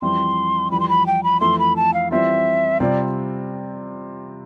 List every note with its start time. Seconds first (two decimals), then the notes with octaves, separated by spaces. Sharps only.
0.02 F2 E3 G3 C4 E4 C6
0.71 F2 E3 G3 B5
0.80 C6
0.89 B5
1.06 G5
1.24 B5
1.40 F2 E3 A3 E4 C6
1.59 B5
1.76 A5
1.94 F5
2.11 E3 G3 C4 F4 E5
2.80 C3 G3 C4 F4 D5